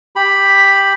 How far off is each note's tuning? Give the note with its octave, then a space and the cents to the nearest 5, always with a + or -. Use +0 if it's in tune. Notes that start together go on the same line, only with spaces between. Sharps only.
G4 +5 B5 +0